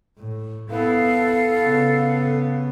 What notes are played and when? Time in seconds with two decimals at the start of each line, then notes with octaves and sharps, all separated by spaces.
0.17 A2
0.69 B3 E4 A4 F5
1.58 C#3 B3